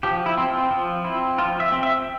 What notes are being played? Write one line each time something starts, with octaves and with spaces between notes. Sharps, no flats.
F3 G4
E4
C4
F4
F3 F4
C4 E4
F3 F4
E5
C4
E5